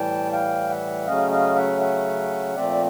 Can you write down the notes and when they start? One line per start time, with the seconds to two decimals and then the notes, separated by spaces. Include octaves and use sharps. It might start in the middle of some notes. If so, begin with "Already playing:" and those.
Already playing: A2 E3 G3 G5 A5
0.32 F5 G5
0.70 E5 F#5
1.06 C#3 F#3 A3 C#4 D#5 F5
1.31 D#5 F5
1.56 E5 F#5
1.81 E5 F#5
2.55 A#2 F3 A3 C4 D5 E5